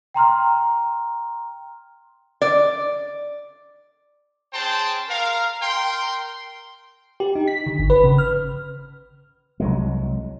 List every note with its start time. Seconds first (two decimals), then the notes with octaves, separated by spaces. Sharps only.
0.14 G5 A#5 C6 F6
2.42 D5
4.53 C#4 G#4 C5 G5 A5 C6
5.09 A#4 F5
5.63 A#4 G5 C6
7.20 G4
7.35 D#4
7.48 B6
7.66 D3
7.79 G#1
7.90 B4
8.04 C#3
8.18 F6
9.60 C2 F#3 G#3